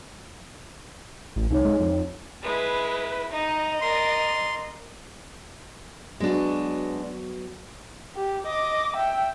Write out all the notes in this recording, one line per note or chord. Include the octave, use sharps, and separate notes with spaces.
A1
C2 D#4 C#5
G#3
F2
G#3 E4 B4
D#4 D#5
A#4 D5 C6
F#3 G#3 B3 D4 F#4
G4
D#5 D6
E5 G5